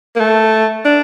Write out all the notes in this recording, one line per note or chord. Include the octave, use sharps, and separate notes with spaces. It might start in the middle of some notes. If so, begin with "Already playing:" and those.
A#3
A3
D4